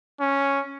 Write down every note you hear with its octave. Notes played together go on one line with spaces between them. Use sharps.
C#4